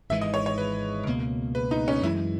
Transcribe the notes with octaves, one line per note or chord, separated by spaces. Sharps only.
G#1 G#2 E3 G#3 E5
D#5
C#5
C#5
B4
C#2 B2 A#3
B4
D#4
C#4
F#2 E3 G#3 E4